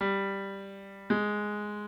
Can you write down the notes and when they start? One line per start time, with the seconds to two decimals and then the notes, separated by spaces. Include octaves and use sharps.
0.01 G3
1.10 G#3